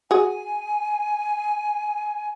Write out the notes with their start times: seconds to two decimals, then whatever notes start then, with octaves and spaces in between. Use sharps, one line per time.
0.11 F#4 G#4 G#5